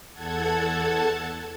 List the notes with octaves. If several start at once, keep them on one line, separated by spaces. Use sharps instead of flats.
E2 A4 F#5 A5 G#6